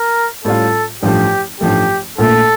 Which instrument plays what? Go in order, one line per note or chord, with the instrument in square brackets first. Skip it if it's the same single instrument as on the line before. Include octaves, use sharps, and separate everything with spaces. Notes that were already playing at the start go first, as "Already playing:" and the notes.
Already playing: [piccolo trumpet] A#4
[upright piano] A2 G3 C#4 F4 [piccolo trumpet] A4
[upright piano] A1 G2 F3 A3 [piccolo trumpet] G4
[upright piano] A1 G2 F3 A3 [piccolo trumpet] G4
[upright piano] A#1 A#2 A3 [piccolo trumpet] A4